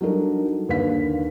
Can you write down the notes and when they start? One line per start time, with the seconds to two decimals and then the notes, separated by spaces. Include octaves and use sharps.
0.01 F#3 G3 D4 D#4 A4 A#4
0.69 D#2 D3 B4 F5 B6